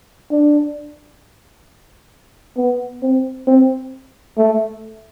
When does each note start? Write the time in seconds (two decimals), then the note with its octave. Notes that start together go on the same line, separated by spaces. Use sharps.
0.31 D4
2.57 B3
3.03 C4
3.47 C4
4.38 A3